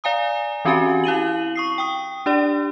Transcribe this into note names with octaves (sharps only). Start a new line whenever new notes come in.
D5 F5 G#5 A#5 D#6
E3 C4 C#4 F#4 G4 G#5
E4 F5 D#7 F#7
C#6 D#6 C7
G5 D#6
D4 G4 D5